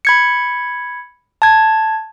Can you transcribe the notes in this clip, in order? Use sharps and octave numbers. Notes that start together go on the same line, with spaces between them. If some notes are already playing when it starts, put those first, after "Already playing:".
B5 G#6 C#7
A5 G#6